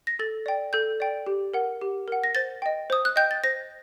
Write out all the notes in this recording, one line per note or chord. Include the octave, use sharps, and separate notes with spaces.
A#6
A4 A6
D5 G5
A4 G6
D5 G5
G4
A#4 F#5
G4
A#4 F#5
A#6
C5 A6
D#5 G5
C5 D#6
F#6
D#5 G5 G6
A6
C5 A#6